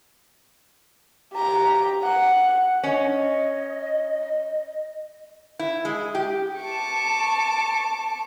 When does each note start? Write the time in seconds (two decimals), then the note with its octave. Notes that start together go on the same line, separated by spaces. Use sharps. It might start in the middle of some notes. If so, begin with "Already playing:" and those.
1.34 G4 A#5
2.04 F#5
2.83 C#4 D#5
5.59 E4
5.85 G#3
6.15 G4
6.60 A5 C#6 D6